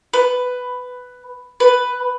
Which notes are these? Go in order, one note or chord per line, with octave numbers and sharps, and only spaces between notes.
B4
B4